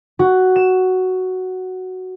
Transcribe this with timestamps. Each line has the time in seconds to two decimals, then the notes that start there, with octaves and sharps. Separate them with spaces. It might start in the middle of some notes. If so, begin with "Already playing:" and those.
0.19 F#4
0.56 E7